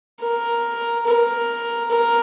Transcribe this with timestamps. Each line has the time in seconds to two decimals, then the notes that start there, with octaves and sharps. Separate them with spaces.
0.21 A#4
1.06 A#4
1.91 A#4